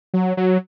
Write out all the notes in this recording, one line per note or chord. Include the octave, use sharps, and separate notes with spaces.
F#3
F#3